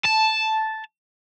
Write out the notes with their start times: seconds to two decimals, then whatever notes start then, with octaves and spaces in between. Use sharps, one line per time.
0.05 A5